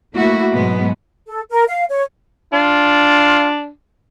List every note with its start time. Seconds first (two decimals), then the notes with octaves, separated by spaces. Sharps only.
0.14 A3 A#3 E4 F#4
0.52 G#2 B2 F#3 G#3 B3
1.27 A4
1.50 A#4
1.68 F5
1.89 C#5
2.53 D4 F4